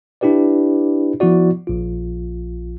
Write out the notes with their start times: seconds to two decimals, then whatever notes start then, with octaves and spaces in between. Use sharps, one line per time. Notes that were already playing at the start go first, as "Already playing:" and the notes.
0.21 D4 E4 G4 B4 D5
1.20 F3 B3 E4 F#4 D5
1.67 A#1 F4